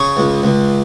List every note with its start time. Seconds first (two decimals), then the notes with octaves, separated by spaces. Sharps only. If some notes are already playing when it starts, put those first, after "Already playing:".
Already playing: C#3 C#5
0.17 C#2
0.43 C#2